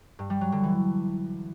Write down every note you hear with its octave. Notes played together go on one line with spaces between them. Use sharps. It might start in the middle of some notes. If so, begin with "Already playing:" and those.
G2
G3
F#3
D3
E3